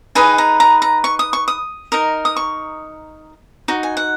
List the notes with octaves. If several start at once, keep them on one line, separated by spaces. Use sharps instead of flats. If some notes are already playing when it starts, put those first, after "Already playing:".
D#4 G#4 B4 D#5 G#5
A#5
A#5
A#5
C#6
D#6
C#6
D#6
D#4 A#4 D#5
D#6
C#6
D#4 F#4
G#5
F#5